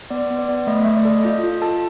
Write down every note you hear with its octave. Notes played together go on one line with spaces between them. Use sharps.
B3 D5
B3
D5
B3
A3 D#5
E5
A3
D5
A4 D#5
F4 D#5
F4
A4 A5